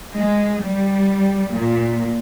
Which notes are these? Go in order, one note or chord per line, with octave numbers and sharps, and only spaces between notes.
G#3
G3
A#2